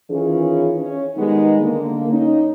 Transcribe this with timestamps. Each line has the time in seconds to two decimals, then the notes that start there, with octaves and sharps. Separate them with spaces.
0.10 D#3 E3 C#4 F4 G#4
0.80 C#4
1.17 D#3 G3 G#3 B3 D#4
1.61 D3 A#3
2.10 C#4 D#4